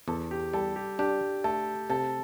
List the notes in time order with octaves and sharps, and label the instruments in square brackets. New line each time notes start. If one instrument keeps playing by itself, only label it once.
[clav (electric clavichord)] E2 [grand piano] A4
[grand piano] G4
[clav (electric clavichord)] G3 [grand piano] A4
[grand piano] G4
[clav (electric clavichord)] D4 [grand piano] G4
[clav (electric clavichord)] A3 [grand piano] A4
[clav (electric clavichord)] C3 [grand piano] A4